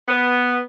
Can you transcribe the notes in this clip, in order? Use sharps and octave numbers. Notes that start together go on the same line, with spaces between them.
B3